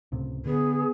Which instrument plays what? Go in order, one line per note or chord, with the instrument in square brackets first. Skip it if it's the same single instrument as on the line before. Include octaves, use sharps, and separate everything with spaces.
[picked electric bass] C#2 A2 C3
[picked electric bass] D3 [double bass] B3 [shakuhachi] G#4